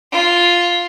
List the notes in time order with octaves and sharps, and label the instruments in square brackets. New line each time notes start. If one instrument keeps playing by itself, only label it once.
[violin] F4